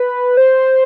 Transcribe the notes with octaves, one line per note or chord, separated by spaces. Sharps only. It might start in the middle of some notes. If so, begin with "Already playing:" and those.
Already playing: B4
C5